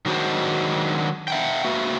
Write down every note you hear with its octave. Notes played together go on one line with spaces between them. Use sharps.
D#3 F#3 G#3 D4 F#4 C5
E5 F#5 G5
A#3 F#4 B4 E5